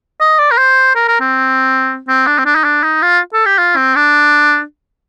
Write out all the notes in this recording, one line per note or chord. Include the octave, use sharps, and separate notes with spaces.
D#5
D5
A#4
C5
A#4
A#4
C4
C4
D4
C4
D4
D#4
D4
D#4
F4
A4
G4
F4
C4
D4